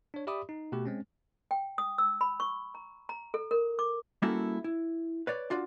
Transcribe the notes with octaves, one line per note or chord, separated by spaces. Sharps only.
D4 C#5
G4 D5 E5 B5 D6 D#6
D#4
B2 A3 G4
G#3 C4 C#4
G5
D#6
E6
B5
C#6
A#5
A#5
A4
A#4
D6
G3 A#3 C#4 E4 F#4 A4
E4
B4 C#5 D5
D4 F4 F#4 D5